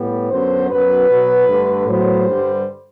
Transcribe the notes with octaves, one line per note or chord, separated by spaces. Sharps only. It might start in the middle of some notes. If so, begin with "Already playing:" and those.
Already playing: A2 G3 B3
F#2 D3 F#3 B3 C5
F#2 F#3 B3 B4
B2 F#3 B3
G2 D3 A3
A2 F#3 B3 C5
G2 D3 G3